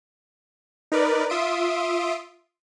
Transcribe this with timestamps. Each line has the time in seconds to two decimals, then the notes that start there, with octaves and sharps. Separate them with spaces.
0.92 D#4 A#4 B4 D5
1.30 F4 E5 C6 D#6 D7